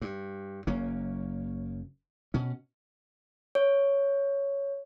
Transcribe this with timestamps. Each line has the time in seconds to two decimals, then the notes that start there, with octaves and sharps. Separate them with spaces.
0.02 G2
0.67 F#1 F#3 A#3 C#4
2.34 B2 C#4
3.55 C#5